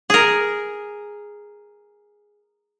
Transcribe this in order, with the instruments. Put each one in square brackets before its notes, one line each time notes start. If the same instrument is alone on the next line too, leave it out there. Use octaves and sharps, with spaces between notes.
[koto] G#4 A#4